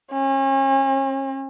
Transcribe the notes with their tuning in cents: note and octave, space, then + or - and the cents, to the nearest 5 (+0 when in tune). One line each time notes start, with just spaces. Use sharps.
C#4 -40